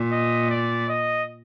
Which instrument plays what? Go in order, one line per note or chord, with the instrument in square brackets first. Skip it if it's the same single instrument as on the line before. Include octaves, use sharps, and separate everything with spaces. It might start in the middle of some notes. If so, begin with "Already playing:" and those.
Already playing: [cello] A#2
[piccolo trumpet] D#5
D5
D#5